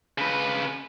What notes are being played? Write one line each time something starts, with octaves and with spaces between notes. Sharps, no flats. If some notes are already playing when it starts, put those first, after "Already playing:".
C#3 B4